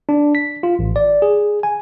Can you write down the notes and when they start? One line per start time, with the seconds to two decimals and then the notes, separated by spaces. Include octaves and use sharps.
0.09 D4
0.35 B6
0.63 F4
0.79 A1
0.96 D5
1.22 G#4
1.63 G#5